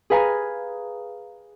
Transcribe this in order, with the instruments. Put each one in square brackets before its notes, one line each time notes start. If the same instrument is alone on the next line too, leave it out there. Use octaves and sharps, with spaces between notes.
[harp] G#4 B4 F5 G#5 A#5